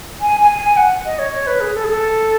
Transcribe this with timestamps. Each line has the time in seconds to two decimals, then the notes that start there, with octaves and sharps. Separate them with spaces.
0.21 G#5
0.40 G#5
0.58 G#5
0.77 F#5
1.05 D#5
1.19 C#5
1.32 C#5
1.47 B4
1.61 G#4
1.75 A4
1.84 G#4
1.89 A4